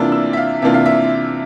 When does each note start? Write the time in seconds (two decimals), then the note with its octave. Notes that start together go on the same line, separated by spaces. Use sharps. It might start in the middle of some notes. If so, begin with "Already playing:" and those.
Already playing: C3 E3 A#3 D4 F4 E6
0.12 E6
0.33 E5
0.37 F5
0.62 C3 E3 A#3 D4 F4 E5
0.74 F5
0.86 E5